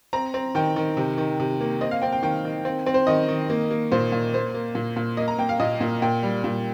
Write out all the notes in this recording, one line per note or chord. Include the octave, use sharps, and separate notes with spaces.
C4 A#5
C4
D#3 G5
D#3
C3
D#3
C3
A#3
C4 D#5
F5
C4 G5
G5
D#3 G5
D#3
C4
C4
C5
D#3 D#5
D#3
A#3
A#3
A#2 C5
A#2
A#3 C5
A#3
A#2
A#2
A#3 D#5
A#5
A#3 G5
F5
A#2 D#5
A#2
A#2 G5
G3
A#2